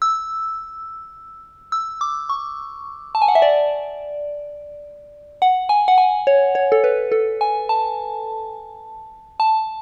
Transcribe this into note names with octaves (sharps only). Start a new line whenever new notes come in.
E6
E6
D6
C#6
A5
G#5
F#5
E5
D5
F#5
G#5
F#5
G#5
C#5
C#5
A4
B4
A4
G#5
A5
A5